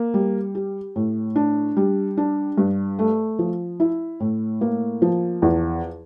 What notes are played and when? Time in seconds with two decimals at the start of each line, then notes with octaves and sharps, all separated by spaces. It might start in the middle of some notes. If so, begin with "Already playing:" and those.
Already playing: A#3
0.14 G3
0.55 G4
0.96 A2
1.36 D4
1.77 G3
2.17 D4
2.58 G2
2.99 A3
3.39 F3
3.80 E4
4.20 A2
4.61 A#3
5.02 F3
5.42 E2